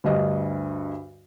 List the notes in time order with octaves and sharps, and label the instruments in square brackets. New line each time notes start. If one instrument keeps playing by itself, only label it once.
[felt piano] D2 G2 D#5